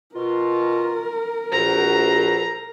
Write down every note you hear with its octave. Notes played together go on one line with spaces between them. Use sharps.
B2 F4 A#4
A#1 F#4 A4 B4 C5 A#5